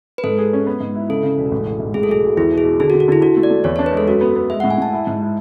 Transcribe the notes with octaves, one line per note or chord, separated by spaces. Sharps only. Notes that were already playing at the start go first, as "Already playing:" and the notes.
B4
G#2 A4
G#4
C#4
B3
G#2
E4
C#3 A4
C#3
E1
A1
A1
G#2
A2 G#4
A4
B1 G#4
F#3
E2 E4
B2
G#4
B2
D3 G#4
F#4
D3
F#4
D3 E4
D3 F#4
A3
D5
A3
E2 C#5
D4 C#5
B4
G#3 A4
F#2 F#4
B3
B3
G#3 E5
A2 F#5
G#5
A2 A5
E4
G#2
E4